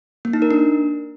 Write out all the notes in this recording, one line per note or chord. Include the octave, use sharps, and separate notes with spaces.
A#3
D#4
A#4
D4